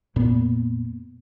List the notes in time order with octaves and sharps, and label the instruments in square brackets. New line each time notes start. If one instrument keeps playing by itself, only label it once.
[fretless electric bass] F2 A#2 A#3 B3